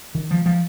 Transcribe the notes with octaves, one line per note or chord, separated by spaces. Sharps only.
D#3
F3
F3